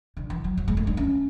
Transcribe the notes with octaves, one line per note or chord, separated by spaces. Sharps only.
D3
E3
F#3
F#3
G#3
A3
D4
C#4